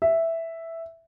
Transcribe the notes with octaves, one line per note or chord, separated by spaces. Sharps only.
E5